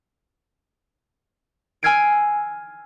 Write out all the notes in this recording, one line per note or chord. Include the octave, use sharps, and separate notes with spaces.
G#5 E6 F6 G#6 C7 D7